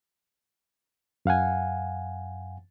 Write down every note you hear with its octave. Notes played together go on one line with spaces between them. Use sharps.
F#2 F5 F#5 G#5